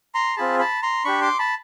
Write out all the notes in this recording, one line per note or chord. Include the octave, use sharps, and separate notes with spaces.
A#5 C6
C4 F4 G#4 A5 B5
A5 B5
A#5 C6
D4 G4 B5 C#6
C6 D6
A5 B5